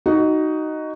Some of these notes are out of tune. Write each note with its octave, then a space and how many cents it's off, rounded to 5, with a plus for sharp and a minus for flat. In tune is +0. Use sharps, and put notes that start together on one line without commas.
D#4 +0 F#4 +15